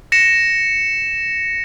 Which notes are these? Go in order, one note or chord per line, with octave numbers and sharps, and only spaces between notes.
A#6 C#7 E7